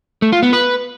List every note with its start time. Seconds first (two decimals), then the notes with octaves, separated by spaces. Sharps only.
0.22 A3
0.32 F4
0.43 B3
0.53 B4